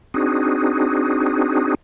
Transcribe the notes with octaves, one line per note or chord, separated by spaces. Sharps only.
C4 D4 D#4 F#4 G#4